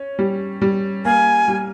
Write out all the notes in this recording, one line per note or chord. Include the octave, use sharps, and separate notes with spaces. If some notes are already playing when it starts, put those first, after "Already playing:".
Already playing: C#4
G3
G3
A#3 G#5
G3